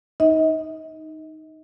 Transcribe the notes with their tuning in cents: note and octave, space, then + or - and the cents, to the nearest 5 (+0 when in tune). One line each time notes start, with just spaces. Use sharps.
D#4 +0 D#5 +40